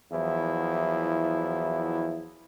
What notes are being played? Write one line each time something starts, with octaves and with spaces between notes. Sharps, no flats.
E2 F3 F#3 E4